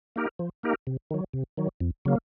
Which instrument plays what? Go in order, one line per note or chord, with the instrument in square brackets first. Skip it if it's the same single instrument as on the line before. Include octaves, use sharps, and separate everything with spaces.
[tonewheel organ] A#3 D#4 G4 A#4
F3
A#3 D#4 G4 A#4
C3
D#3 F#3
C3
D#3 F#3
F2
C#3 F#3 A#3